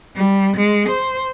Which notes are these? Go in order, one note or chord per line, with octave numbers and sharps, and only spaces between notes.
G3
G#3
C5